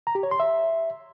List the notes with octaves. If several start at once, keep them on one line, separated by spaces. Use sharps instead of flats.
A#5
G4
C#5
C6
E5